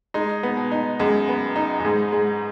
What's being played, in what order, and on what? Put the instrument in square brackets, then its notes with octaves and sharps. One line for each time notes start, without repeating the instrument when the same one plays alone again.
[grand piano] G#3 [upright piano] D#4
[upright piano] B3
[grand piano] B2
[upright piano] D#4
[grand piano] F#2 [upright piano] G#3
[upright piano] B3
D#4
[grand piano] F#2
[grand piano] G#2 [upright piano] G#3
[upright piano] G#3